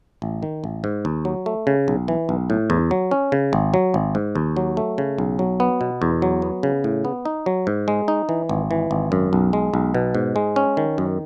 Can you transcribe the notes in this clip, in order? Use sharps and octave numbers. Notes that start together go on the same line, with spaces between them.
A1
D#3
A1
G#2
D#2
F#3
A3
C#3
B1
E3
B1
A2
E2
F#3
C#4
C#3
G#1
F#3
G#1
G#2
D#2
F#3
A3
C#3
B1
F#3
B3
B2
E2
F#3
B3
C#3
A2
B3
D#4
F#3
G#2
G#3
D#4
E3
G#1
E3
G#1
F#2
B1
G#3
B1
B2
G#2
G#3
C#4
D#3
F#2